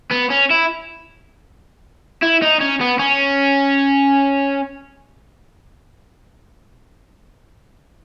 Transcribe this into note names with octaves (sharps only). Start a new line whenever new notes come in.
B3
C#4
E4
E4
D#4
C#4
B3
C#4